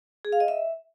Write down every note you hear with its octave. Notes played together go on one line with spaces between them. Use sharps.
G#4
F5
D#5
E5